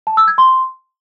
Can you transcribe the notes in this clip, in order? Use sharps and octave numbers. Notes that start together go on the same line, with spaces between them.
A5
E6
G#6
C6